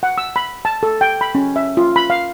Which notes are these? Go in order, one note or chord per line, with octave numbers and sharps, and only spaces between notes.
F#5
E6
B5
A5
A4
G5
B5
C#4
E5
F4
B5
F5